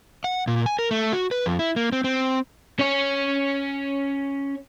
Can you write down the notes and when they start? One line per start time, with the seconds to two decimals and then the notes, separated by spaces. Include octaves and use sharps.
0.24 F#5
0.47 A#2
0.66 G#5
0.79 A#4
0.91 A3
1.12 F#4
1.31 B4
1.46 F2
1.59 E4
1.76 A#3
1.92 C4
2.04 C4
2.79 C#4 C#5